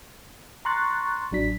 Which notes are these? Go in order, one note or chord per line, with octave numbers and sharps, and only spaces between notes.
A#5 C6 C#6 F#6 A6
A1 F#3 D4 B6